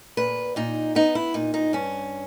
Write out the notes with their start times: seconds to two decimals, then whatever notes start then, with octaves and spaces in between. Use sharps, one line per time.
0.17 A#2 B4
0.56 A#2 D#4
0.95 B3 D#4
1.15 E4
1.34 A#2 D#4
1.54 D#4
1.73 G2 C#4